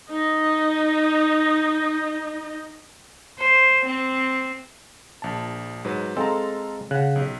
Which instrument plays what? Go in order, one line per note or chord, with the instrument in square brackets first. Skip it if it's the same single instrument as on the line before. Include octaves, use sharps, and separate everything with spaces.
[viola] D#4 D#5
[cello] C5
C4
[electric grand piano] A#1 A5
G#2 F#3 B4
[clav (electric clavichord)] G#3 C4 [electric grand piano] A4 F5 A#5
[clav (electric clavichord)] C#3 [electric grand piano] F#5 F#6
[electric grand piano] B1